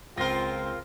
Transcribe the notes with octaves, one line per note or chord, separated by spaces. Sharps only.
C#2 C4 F4 A#4 A#6